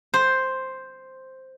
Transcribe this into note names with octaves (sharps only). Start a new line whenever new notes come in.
C5